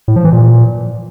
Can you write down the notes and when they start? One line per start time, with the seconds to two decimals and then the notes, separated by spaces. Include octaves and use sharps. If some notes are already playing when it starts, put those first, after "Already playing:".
0.08 A2
0.16 F3
0.24 E3
0.32 A#2